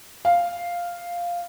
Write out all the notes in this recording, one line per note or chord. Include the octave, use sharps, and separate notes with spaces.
F5